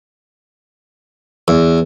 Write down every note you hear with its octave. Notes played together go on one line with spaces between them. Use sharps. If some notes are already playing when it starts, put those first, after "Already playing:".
E2